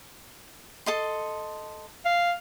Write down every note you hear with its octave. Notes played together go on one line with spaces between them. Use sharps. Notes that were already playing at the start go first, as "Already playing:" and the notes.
A4 D#5 C6
F5